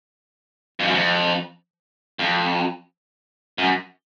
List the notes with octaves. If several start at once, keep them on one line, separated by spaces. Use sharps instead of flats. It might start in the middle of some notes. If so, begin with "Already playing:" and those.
F2
F#2
F2
F2
F#2